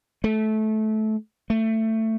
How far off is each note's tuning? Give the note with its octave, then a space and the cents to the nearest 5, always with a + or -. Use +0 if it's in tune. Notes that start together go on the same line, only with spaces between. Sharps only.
A3 -20
A3 +15